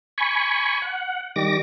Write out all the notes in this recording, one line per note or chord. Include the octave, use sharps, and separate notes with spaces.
G#5 B5 C#6
F#5
D#3 G3 D6 A#6